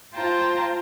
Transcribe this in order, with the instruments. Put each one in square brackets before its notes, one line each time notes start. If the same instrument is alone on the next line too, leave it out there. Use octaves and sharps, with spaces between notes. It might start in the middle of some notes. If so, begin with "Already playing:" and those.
[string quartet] F4 C5 G5 A5 A#5